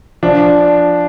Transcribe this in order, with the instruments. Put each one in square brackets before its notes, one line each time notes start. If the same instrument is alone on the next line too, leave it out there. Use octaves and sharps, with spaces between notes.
[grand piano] F3 D4